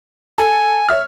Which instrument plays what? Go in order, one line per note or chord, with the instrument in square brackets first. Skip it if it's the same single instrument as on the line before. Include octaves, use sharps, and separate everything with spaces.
[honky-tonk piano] A4 [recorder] G#5
[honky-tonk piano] C#5 E5 F6